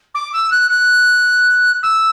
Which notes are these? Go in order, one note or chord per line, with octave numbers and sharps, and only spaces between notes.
D6
E6
F#6
F#6
E6